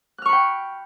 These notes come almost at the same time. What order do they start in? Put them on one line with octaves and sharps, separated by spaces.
F#6 F6 C#6 B5 G5